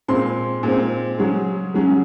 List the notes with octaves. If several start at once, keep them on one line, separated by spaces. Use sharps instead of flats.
A#2 G#3 C4 C6
A#2 G#3 C4
C#3 F#3 C#4
C#3 F#3 C#4